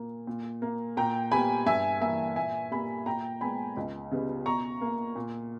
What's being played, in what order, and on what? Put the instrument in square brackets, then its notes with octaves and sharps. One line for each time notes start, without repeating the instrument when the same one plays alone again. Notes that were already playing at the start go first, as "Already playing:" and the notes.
Already playing: [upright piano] A#2 A#3
A#2
A#3
A#2 G5 A#5
G3 B3 G#5 B5
G2 E5 G#5
E3 A#3 E5 G#5
A#2 E5 G#5
G3 A#3 G#5 B5
A#2 G5 A#5
G#3 B3 G#5 B5
C#2
C#3 G3 B3
B2 A#5 C#6
A#3
A#2